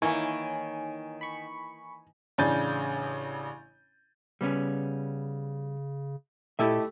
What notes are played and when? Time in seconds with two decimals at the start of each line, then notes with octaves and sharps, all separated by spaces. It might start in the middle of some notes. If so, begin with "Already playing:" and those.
0.02 D#3 E3 A#3 E4 C#5 G#5
1.21 B5 C#6
2.38 A1 C#3 D4 G#5 G6 A6
4.41 C#3 G3 B3 C#4
6.59 A#2 A3 E4 G4 A4 D#5 E5